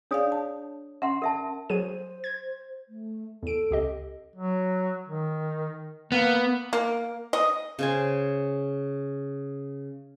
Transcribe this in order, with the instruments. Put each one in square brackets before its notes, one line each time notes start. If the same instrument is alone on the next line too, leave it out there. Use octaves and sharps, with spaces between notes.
[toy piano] D4 C#5 D#6 [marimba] G#4 D5 F5
[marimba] A5
[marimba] C#4 [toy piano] E5 F#5 C6
[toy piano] A#4 E5 A5
[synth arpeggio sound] F#3 G#4 D#7 [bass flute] C5
[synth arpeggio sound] G#6
[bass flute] A3
[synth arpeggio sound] E2 D7 [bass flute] A4
[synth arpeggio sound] C#2 G4 D#5
[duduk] F#3
D#3
[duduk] A#3 [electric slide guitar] B3
[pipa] A#3
D#5
[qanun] C#3 C5 G#5